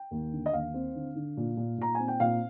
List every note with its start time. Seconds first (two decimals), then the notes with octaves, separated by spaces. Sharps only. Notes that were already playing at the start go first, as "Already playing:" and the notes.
Already playing: G5
0.11 D#2
0.32 D3
0.46 D#5
0.53 D#2 F5
0.74 C4
0.95 D3
1.15 D3
1.37 A#2
1.57 A#2
1.78 A#2 A#5
1.95 C4 G#5
2.08 G5
2.20 A#2 F5